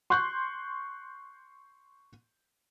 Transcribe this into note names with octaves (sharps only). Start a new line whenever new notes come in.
C6 C#6 F#6 G6